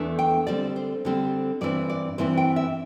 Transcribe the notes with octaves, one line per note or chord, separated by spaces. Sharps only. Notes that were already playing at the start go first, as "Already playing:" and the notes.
Already playing: E2 E3 A3 D4
G5
D3 G3 C4 D5
C5
D3 G3 C4
G2 E3 C4 E4 D5
D5
G2 E3 C4 E4 C5
G5
E5